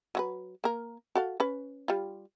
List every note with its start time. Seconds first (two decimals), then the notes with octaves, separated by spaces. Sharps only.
0.15 F#3 F#4 B4
0.64 A#3 A#4
1.15 F#4 A4 F5
1.40 C#4 B4
1.88 G3 F4